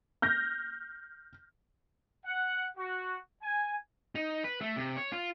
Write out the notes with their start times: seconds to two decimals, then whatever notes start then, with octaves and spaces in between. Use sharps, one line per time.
0.22 F6 G6 A#6
2.25 F#5
2.77 F#4
3.42 G#5
4.15 D#4
4.44 B4
4.61 A3
4.77 C3
4.97 C#5
5.12 F4